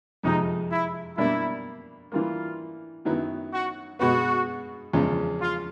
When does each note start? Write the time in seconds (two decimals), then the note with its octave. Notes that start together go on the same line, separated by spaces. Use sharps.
0.23 F2 C3 F3 G#3 D#4
0.71 E4
1.17 B2 G3 A#3 D4 E4
2.12 E3 G3 A#3 F4
3.05 F#2 D#3 F#3 B3 E4
3.52 F#4
3.99 B2 G#3 B3 F#4
4.93 E2 C#3 F3 G#3
5.40 F4